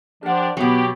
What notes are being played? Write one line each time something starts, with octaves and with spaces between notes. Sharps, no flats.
F3 D4 G4 A#4 F#5
B2 F#3 B3 G4